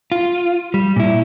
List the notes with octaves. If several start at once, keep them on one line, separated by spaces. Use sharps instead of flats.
F4
G3
A#2 E4